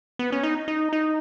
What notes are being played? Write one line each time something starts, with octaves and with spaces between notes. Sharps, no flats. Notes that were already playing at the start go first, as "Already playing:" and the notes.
B3
C#4
D#4
D#4
D#4